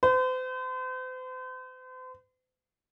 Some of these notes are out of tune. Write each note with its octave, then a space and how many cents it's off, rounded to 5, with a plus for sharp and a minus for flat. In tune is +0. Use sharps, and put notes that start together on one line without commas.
C5 -40